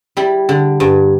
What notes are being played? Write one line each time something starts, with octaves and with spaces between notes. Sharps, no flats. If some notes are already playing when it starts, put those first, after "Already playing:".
G3 E4
D3
G2